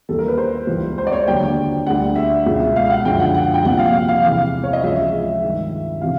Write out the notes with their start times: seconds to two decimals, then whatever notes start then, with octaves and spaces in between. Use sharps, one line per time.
0.09 D#2 C#3 E3 G3 A4
0.19 A#4
0.28 B4
0.38 C5
0.67 C#2 C#3 E3 G3
0.98 C5
1.07 D5
1.12 C#5
1.27 D#2 D3 F#3 G5
1.87 D2 D3 G3 F#5
2.16 E5
2.46 C#2 B2 G#3
2.76 F5
2.90 F#5
3.05 F#2 D3 F3 G#3 G5
3.20 F#5
3.34 F#5
3.54 G5
3.64 C2 A#2 F3 F#5
3.79 F5
4.08 F5
4.24 E2 C3 E3 G#3 F5
4.64 C#5
4.73 D#5
4.83 C#2 C#3 F3 G#3 E5
5.42 G2 D#3 G3
6.01 C3 E3 F5